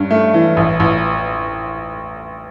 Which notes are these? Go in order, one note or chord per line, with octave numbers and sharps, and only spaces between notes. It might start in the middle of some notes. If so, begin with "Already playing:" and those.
Already playing: G2 C#4
A3
E3
A1
A1